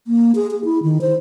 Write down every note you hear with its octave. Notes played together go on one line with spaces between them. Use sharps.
A#3
G#4
G#4
E4
D#3
C5